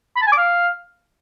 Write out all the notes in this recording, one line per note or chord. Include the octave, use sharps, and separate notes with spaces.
B5
A5
G#5
D6
F5